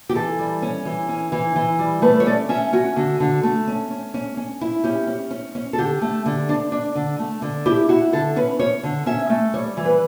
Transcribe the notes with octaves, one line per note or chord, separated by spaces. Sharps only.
G4
E3 A4
G3
C#4
E3
C#4
E3
E3
G3
A3 B4
C#5
C#4 D5
C#4 E5
C#4 F#4
D3 F#4
D3
A3
C#4
C#4
C#4
C#4
E4
C#4 G4
C#4
C#4
C#4
A4
D3 G4
A3
D3
D4
D4
D3
A3
D3
E4 G4
E4 F#4
D3 A4
C#4 B4
C#4 C#5
D3
C#4 E5
A3
G3 C#5
E3
B4